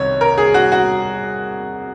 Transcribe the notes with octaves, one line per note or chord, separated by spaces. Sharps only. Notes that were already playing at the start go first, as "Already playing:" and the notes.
Already playing: C2 C3 D#3 C#5
A#4
G#4
F#4
F#4